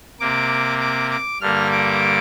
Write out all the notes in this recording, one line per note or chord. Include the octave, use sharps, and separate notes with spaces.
C3 A#3 D6
D6
D6
G2 D3 G3 A#3 F6
D6